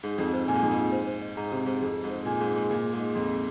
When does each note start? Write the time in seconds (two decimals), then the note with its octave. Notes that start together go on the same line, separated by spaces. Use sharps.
0.03 G#2 D#4
0.18 F2 D#4
0.33 G#2 C5
0.48 A#2 G#5
0.55 G#2
0.63 F2 D#4
0.71 G#2
0.77 D#4
0.92 C5
1.07 C5
1.22 D#5
1.37 G#2 A#5
1.51 C3 C5
1.66 G#2 C5
1.82 F2 G#4
1.96 G#4
2.04 G#2
2.10 C5
2.25 A#2 G#5
2.40 G#2 G#4
2.56 G#2 G#4
2.71 A#2 G#4
2.85 G#4
2.93 G#2
3.00 D#5
3.14 F2 C6
3.30 G#4